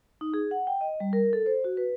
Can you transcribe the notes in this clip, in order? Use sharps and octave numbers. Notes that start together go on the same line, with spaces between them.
D#4
G#4
F#5
G5
D#5
G3
A#4
A4
C5
F#4
B4